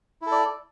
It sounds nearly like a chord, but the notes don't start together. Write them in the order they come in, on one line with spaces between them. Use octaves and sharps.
E4 A4 D5